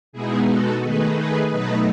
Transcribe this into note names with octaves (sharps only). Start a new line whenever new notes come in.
B2 G#3 B3 D#4 E4 G#4
F#4 A4
D#3 A3 D#4 G#4 B4
G#4 B4
B2 F#3 A3 D#4 B4 D#5